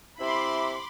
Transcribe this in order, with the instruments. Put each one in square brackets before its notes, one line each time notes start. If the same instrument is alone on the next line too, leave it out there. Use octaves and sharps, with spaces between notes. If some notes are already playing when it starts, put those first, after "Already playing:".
[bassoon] C3 [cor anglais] E4 [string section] B5 C6 D6